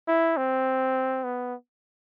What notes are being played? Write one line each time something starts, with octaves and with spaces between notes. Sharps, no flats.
E4
C4
B3